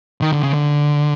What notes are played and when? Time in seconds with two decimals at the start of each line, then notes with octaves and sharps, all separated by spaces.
0.22 D#3
0.33 D3
0.43 C#3
0.54 D3